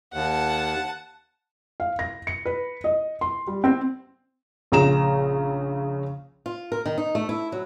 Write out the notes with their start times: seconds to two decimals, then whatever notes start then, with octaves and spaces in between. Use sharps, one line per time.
0.14 D#2 F#5 A5
1.80 F5
1.99 A#6
2.27 C#7
2.46 B4
2.84 D#5
3.21 C6
3.47 G3
3.64 C4
4.72 A#1 C#3 A#5 E7
6.46 F4
6.72 A#4
6.86 D#3
6.98 D#4
7.15 A3
7.29 E4
7.52 F#3